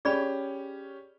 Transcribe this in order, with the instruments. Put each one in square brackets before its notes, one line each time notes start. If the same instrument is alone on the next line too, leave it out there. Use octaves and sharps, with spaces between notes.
[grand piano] C#4 G4 [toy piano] G#4 D5 B5